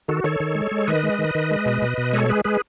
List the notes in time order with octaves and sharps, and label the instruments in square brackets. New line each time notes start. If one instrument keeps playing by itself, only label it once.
[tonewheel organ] D#3 F#4 A4
D#3 A4 C#5
D#3
G#3
G#3
D#3 B4 D#5
G#3
D#3
D#3
G#3
B2
B2
B2
G#3 A4 C#5
G#3 G#4 B4
G#3 G#4 B4